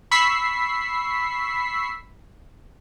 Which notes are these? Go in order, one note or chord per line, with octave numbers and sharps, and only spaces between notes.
B5 C#6 E6 B6 C7